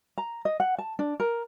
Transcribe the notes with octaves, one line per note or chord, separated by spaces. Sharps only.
A#5
D#5
F#5
A5
D4
A#4